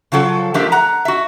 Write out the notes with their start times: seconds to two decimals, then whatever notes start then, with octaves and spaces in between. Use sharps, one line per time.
0.12 C#3 F3 F#3 A4
0.54 F3 A3 D4 G4 A#4 E5
0.72 F#5 A#5
1.05 F#4 E5